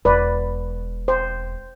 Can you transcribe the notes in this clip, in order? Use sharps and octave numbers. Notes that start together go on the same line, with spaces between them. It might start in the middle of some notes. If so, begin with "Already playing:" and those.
E1 B4 D5
C5